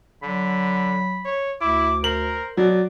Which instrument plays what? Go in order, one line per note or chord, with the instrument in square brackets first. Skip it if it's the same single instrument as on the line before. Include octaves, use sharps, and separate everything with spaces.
[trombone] D3 [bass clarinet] F#3 [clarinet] B5
[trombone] C#5
[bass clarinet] D2 [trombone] E4 [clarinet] D6
[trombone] A#4 [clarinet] C5 [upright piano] F#7
[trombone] B2 [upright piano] F#3 [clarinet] D5